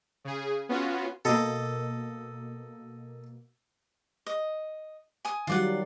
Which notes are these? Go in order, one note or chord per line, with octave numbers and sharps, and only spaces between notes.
C#3 G#4
B3 C#4 F4 F#4
B2 A#3 A4 D#5
D#5
G#5 D#6
D#3 F#3 G3 F4 D5 F#5